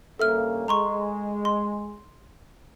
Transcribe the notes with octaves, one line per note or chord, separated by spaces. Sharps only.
G2 C#3 A#3 A4 E5 F6
G#3 A#5 C6 C#6
C6